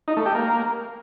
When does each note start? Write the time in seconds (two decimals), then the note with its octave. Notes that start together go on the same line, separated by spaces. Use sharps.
0.08 D#4
0.17 A3
0.26 G4
0.35 A#3